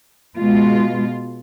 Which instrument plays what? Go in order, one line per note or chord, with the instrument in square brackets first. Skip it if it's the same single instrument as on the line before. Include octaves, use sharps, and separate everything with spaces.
[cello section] B2 G#3 F4